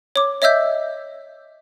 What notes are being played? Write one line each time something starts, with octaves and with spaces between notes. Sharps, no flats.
C#5 D6
C#5 D#5 E5 E6 G6 B6